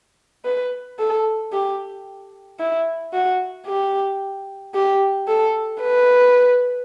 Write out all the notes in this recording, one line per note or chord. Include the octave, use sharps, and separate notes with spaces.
B4
A4
G4
E4
F#4
G4
G4
A4
B4